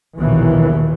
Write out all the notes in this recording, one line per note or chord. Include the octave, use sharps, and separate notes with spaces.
A#1 D#2 B2 D#3 E3